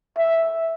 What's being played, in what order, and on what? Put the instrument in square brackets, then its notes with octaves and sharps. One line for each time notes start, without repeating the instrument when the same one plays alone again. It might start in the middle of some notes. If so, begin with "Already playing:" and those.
[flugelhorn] E5